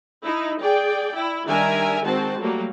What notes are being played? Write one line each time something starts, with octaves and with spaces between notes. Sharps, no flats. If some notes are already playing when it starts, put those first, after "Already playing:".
D#4 E4
G#4 D5 G5
E4
D#3 G3 D4 A#4 E5 G#5
D#3 G#3 C4 F#4 C5 A5
F#3 G3 A3 A#3 F#4